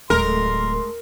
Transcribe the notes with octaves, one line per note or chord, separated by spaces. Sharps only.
D1 G#3 A3 A4 A#4 C6